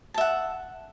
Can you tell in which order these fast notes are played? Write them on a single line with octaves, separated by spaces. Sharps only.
A5 E5 F#5